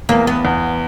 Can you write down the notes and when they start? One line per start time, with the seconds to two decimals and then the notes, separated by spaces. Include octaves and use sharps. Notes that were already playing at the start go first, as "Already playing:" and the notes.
0.09 E2 A#3
0.27 B3
0.45 E2